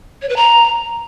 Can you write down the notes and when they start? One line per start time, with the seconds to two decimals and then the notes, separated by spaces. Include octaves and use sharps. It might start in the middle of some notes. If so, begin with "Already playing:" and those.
0.22 C#5
0.29 B4
0.36 A#5